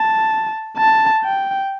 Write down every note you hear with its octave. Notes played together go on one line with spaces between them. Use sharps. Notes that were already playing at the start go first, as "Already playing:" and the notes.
Already playing: A5
A5
G5